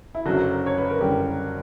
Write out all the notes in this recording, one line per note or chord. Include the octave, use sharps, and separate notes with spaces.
E4
F#1 F#2 D3 F#3 F#4
C#5
B4
A#4
F#1 F#2 D3 G3 G4